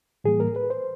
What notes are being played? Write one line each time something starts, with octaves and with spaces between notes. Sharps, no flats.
A2 E3 G3 A#3 G#4
A#4
B4
C5